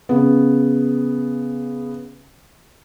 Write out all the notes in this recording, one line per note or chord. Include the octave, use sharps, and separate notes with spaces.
C#3 B3